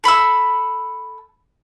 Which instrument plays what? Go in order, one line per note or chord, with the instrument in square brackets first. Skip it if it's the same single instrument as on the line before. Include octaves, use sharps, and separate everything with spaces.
[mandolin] A4 B5 C6 E6